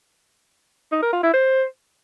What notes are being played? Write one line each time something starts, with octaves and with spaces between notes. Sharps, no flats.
D#4
A#4
F4
E4
C5